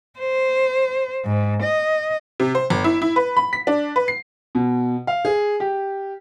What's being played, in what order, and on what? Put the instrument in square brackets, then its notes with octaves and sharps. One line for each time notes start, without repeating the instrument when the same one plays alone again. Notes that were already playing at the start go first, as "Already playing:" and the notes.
[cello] C5
G#2
D#5
[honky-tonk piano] C3
C5
G1
E4
E4
B4
B5
B6
D4
B4
C7
[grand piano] B2
F5
G#4
G4